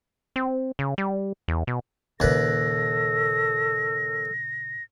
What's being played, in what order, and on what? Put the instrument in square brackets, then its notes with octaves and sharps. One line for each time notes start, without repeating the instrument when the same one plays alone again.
[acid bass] C4
C#3
G3
E2
B2
[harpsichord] D#2 B4 [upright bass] A#2 C#3 [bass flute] A4 [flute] A#6